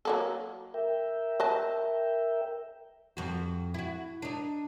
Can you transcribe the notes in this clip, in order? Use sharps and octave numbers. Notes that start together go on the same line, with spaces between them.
F#3 A#3 A4
A#4 E5 G5
B4 D#5 A5
F2 F#4
E4 F#4
D4 D#4